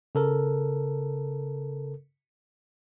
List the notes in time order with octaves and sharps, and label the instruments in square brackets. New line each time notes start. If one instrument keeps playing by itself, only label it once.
[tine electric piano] C#3 A4 A#4